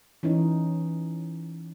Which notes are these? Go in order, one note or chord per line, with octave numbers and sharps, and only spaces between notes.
E3 C#4 D#4